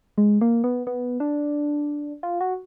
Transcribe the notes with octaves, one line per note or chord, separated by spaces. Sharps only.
G#3
A#3
B3
B3
D4
F4
F#4